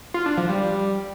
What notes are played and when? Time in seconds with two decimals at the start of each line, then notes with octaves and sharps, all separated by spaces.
0.14 F4
0.26 D4
0.37 F3
0.49 G3